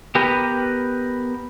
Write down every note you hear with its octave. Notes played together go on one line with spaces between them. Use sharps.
B3 G4 A#4 B4